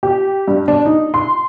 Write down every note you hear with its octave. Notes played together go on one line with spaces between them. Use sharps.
G4
G2
D4
D#4
C6